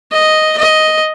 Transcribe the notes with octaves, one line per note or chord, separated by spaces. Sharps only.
D#5
D#5